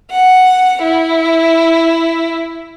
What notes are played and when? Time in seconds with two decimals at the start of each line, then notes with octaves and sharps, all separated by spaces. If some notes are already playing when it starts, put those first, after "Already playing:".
0.10 F#5
0.82 E4